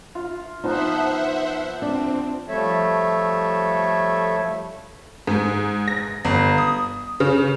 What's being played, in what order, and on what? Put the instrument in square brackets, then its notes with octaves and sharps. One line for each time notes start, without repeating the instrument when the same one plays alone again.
[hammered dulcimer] F4
[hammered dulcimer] F3 B3 [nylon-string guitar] D#4 [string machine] C5 E5 F#5
[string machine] C4 [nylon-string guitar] D4
[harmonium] F3 G3 A3 A4 C#5 E5
[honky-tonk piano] G#2
A#6
G1
D#6
C#3